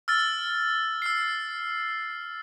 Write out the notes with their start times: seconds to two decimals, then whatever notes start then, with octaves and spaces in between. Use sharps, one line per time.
0.08 E6 F6 A6
1.02 E6 C7